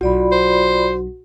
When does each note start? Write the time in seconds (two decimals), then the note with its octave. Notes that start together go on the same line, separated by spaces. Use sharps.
0.01 B1 F4 F#4 D5 B5
0.32 C5